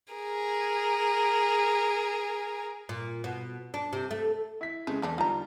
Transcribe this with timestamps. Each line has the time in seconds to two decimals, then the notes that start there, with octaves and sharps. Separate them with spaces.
0.13 G#4 A#4
2.89 A#2
3.24 B2
3.74 D4
3.93 C3
4.11 A3
4.61 E4 B6
4.87 C#3 G#3 A3
5.02 E2 D3 A3 D4
5.18 D3 G3 D#4 F4 A#5